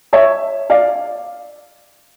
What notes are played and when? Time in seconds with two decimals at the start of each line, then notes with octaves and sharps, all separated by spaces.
0.13 C#5 E5
0.70 D5 F5